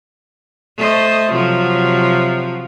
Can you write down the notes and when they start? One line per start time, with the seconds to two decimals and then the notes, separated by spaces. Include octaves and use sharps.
0.77 A3 C5 D#5
1.31 C3 F3 F#3